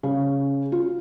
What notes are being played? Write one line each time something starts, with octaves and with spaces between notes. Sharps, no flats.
C#3
F4